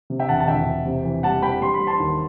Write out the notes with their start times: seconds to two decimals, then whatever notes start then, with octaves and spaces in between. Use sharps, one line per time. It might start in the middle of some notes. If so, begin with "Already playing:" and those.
0.10 C3
0.19 E5 G5
0.29 E1 F#5 A5
0.40 A5
0.47 E1 E5 G5
0.67 E1
0.86 C3
1.04 E3
1.23 G3 F#5 A5
1.42 G3 G5 B5
1.61 G3 C6
1.74 B5
1.80 G3
1.87 A5 C6
2.00 D#2